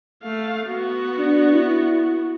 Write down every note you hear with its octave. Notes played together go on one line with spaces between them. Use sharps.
A3 F5
B3 F#4
D4
E4